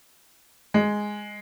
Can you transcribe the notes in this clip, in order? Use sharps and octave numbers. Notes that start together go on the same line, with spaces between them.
G#3